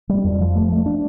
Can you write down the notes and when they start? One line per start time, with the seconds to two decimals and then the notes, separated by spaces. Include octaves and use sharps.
0.09 G3
0.24 F2
0.41 F3
0.55 A3
0.72 A3
0.86 D4